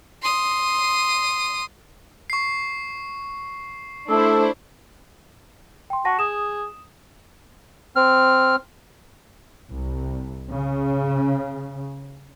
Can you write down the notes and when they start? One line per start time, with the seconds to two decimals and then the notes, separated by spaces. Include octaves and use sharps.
0.22 C6 D#6
2.30 C#6 C7
4.09 A3 D4 E4 A4 C5
5.90 G5 C6
6.05 F#4 F#5 A5 A#6
6.19 G#4 D#6 E7
7.96 C4 F6
9.70 C2
10.51 C#3